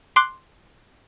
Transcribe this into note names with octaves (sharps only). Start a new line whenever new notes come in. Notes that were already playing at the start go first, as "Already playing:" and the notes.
C6 D6 F#6